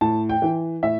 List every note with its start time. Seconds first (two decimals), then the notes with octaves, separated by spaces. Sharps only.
0.01 A2 A5
0.29 G5
0.42 E3
0.83 A2 E5